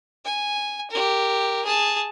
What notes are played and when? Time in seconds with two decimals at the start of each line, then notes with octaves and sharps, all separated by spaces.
0.25 G#5
0.90 G4 A#4
1.65 G#4 A5